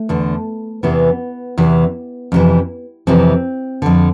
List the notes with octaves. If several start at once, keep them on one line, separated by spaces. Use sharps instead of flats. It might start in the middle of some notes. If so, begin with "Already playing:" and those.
Already playing: A3
E2 D3
E2 C3 E3 B3
E2 C3 E3
F2 C3 E3
F2 C3 E3 C4
F2 D3